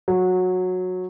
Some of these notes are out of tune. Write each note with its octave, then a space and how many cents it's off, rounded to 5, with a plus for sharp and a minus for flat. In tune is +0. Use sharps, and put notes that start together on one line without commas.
F#3 -15